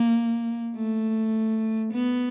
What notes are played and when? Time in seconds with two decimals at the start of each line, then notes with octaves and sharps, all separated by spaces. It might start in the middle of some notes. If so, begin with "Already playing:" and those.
Already playing: A#3
0.75 A3
1.93 B3